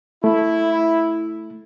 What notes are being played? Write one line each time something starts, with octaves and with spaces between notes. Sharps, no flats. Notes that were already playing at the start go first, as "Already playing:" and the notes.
A3 E4